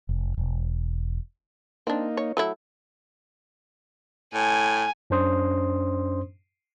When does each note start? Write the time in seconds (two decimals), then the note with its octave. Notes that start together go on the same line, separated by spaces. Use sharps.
0.09 F1
0.38 E1
1.87 A#3 C4 D4 D#4
2.17 C#5
2.37 F#3 A3 E4
4.34 A2 G#5
5.10 F#2 C#4 D4 C5 C6 D#6